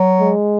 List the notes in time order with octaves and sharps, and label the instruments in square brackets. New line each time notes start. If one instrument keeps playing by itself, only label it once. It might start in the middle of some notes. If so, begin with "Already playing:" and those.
Already playing: [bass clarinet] F#3
[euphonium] G#3